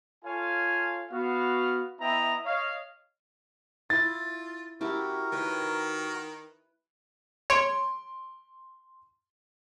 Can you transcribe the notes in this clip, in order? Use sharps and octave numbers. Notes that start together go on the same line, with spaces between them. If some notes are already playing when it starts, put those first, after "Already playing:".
F4 A4 C#5 F5 G#5
B3 F#4 F5
B3 E4 D#5 E5 G5 A#5
C#5 D#5 F5
E4 F4 A6
F#2 E4 F#4 G4 A#4 A5
D#3 B4 C#5
C#5 C6 D7